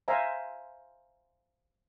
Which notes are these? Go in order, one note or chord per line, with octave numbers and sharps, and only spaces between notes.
C5 E5 F5 G#5 A#5